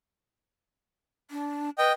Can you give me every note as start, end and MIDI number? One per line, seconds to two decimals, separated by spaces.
1.31 1.70 62
1.78 1.90 71
1.78 1.92 75
1.78 1.92 79